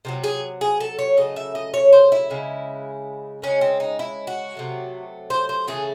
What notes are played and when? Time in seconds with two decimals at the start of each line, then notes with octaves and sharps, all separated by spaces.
0.05 C3 D#3 F#3
0.24 G#4
0.61 G#4
0.80 A4
0.99 C#5
1.17 C#3 F#3 A3 D#5
1.36 E5
1.55 D#5
1.74 C#5
1.93 C5
2.12 E4
2.30 C#3 G#3
3.42 C#3 G#3 C#4
3.61 C4
3.80 D#4
3.99 E4
4.27 F#4
4.55 C3 F#3 A3
5.30 C5
5.49 C5
5.68 C#3 E3 A3 G#4